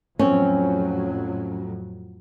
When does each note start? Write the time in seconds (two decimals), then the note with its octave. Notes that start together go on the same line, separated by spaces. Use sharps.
0.19 F2 A2 F#3 C4 C#4